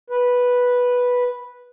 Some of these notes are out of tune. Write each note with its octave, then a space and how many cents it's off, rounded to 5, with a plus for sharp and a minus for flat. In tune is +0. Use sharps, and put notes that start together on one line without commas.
B4 -5